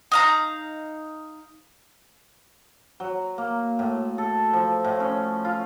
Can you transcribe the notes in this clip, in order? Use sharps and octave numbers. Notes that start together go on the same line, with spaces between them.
D#4 F5 A#5
F#3
A#3
A2
A4
F3
A2
C#4
F4